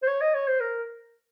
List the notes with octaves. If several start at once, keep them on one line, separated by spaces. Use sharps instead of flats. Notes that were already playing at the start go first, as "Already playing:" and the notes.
C5
C#5
D#5
C#5
C5
A#4